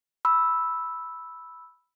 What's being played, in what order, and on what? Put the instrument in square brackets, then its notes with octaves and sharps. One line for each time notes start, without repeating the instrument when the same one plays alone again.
[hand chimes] B5 E6